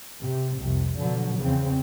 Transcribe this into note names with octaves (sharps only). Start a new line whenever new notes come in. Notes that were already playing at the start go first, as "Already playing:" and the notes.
C3
C2 F2 C3
B2 D3 F3 F#3
E2 C#3 C4